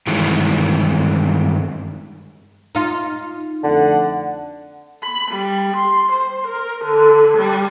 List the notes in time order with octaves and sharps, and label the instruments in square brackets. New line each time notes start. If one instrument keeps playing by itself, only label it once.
[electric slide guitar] G2 D#3 E3 G#3
[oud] D#4 F4
[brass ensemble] F2 A3 F#5 [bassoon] D3
[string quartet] B5
G3
C6
C5
A#4
D3
G3